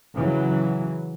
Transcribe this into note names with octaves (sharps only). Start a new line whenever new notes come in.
C#3 E3 F#3